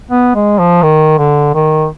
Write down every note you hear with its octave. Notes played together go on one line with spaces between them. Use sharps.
B3
G#3
F3
D#3
D3
D#3